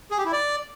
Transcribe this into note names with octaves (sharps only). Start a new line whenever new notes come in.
G#4
G4
E4
D5